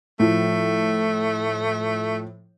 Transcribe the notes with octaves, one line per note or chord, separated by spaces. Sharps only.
A2 F3 A3